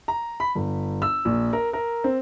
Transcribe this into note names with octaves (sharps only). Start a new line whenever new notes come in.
A#5
B5
G1
E6
A#1
A#4
A#4
C4